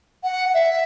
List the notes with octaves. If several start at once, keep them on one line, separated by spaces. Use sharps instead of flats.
F#5
E5